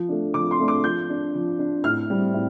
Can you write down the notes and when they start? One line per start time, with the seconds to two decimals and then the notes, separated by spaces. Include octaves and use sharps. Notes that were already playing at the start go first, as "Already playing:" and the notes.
Already playing: F3
0.09 A3 D4
0.34 F3 D6
0.51 C6
0.59 A3 D4
0.68 D6
0.84 F3 G6
1.10 D4
1.35 F3
1.59 D4
1.84 A2 F6
2.10 G3 C4
2.34 A2